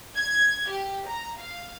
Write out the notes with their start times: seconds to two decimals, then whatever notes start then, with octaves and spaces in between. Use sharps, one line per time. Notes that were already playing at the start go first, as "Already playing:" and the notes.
0.16 G#6
0.70 G4
1.08 A#5
1.39 F5